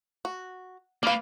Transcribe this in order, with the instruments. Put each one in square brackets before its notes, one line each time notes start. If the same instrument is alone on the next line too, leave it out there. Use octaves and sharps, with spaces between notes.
[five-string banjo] F#4
[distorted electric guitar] A#3 B4 [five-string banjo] D5 F5